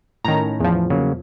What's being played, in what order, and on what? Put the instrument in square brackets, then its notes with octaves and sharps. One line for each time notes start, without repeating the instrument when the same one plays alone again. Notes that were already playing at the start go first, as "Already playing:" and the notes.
[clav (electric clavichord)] A2 C#4 [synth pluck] D#3 A#5
[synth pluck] E2 F3
[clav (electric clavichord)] C#3 F#3 A#3